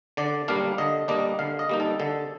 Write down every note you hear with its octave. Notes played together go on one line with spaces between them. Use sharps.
D3 D5
G3 A#3 D4 F5
D3 D#5
G3 A#3 D4 D#5
D3 F5
D#5
G3 A#3 D#4
A4
D3 A4